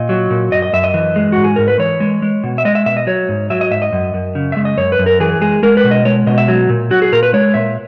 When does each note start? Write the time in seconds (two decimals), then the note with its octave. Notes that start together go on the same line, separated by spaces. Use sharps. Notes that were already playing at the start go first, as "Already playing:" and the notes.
Already playing: A#2 D#5
0.09 F#3
0.31 A#2
0.52 F#2 D#5
0.62 D#5
0.73 F#2 E5
0.84 D#5
0.94 E3
1.16 G#3
1.32 G#2 F#4
1.44 G#4
1.56 G#2 A#4
1.68 B4
1.79 E3 C#5
2.00 G#3
2.22 G#3
2.44 B2
2.58 E5
2.65 G#3 D#5
2.75 E5
2.86 B2 E5
2.97 D#5
3.07 F#3 C#5
3.29 G#2
3.50 F#3 E5
3.61 D#5
3.71 G#2 E5
3.82 D#5
3.93 F#2
4.14 F#2
4.35 C#3
4.52 G#3 E5
4.65 D#5
4.78 F#2 C#5
4.92 B4
4.99 F#2
5.06 A#4
5.20 E3 G#4
5.41 G#3 G#4
5.63 G#3 A#4
5.77 B4
5.84 B2
5.91 D#5
6.05 G#3 C#5
6.27 B2 D#5
6.38 E5
6.48 F#3
6.69 A#2
6.91 F#3 F#4
7.02 G#4
7.12 A#2 A#4
7.23 B4
7.33 G#3 C#5
7.54 A#2 E5